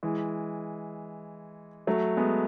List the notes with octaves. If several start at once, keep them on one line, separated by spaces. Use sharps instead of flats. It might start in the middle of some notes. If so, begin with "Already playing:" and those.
E3 G#3
F#3 A3
G#3 B3